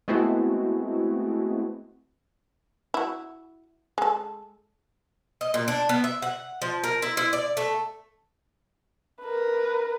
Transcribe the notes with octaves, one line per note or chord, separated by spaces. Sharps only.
G#3 A3 B3 C4 E4 F#4
E4 F#4
G#3 A4
D#5
A#2
D4
B3
E5
F#5
F3
A#4
E4
E4
D5
A3
A#4 B4